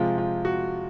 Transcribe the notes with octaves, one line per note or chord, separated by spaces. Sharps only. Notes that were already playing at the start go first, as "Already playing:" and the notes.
Already playing: C3 F3 G#3 F4
F4
F#4